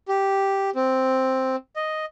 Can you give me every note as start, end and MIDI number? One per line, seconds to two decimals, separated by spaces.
0.09 0.70 67
0.76 1.56 60
1.76 2.05 75